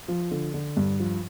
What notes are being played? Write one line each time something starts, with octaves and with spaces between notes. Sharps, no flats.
F3
D3
D3
G2
F3